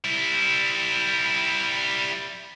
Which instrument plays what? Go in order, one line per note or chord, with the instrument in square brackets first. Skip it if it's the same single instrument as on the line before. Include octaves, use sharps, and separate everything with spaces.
[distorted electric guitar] G3 E4